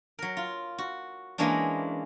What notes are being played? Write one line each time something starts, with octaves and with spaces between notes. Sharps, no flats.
F#3 A#4
F4
F#4
E3 G#3 A#3 C#4 D4